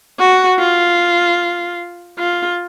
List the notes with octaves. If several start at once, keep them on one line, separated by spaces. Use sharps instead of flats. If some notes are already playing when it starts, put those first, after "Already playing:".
F#4
F4
F4